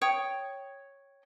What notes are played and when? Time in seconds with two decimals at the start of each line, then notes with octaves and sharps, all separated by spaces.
0.01 C#5 G5 D#6